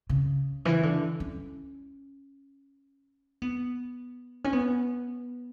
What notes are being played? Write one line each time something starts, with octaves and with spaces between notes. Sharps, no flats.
C#3
E3
D3
C#4
B3
C#4
B3